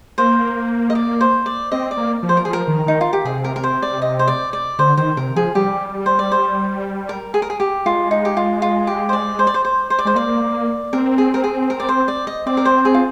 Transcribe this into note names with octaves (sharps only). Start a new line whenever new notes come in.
A#3 C5
D#5
D5
C5
D5
C4 D#5
D5
A#3
F3
C5
A#4
G#4
F3
A#4
D#3
D#3 D#4
F4
G4
C3 G#4
A#4
A#4
C5
D5
D#5
C5
D5
D5
D3 C5
D#3 C5
C3 A#4
F3 G#4
G3 G4
C5
D5
C5
A#4
G#4
A#4
G#4
G4
G#3 F4
D#4
G4
F4
F4
G4
C5
D5
C5
D5
C5
C5
C5
D5
G#3 C5
A#3 D5
C4 A#4
G#4
A#4
G#4
A#4
D5
C5
D5
D#5
C4 D5
A#4
C5
G#4
F4